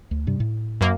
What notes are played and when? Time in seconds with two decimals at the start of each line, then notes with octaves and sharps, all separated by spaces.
0.11 D2
0.27 G2 C3 G3
0.40 A2
0.81 F#2 A#3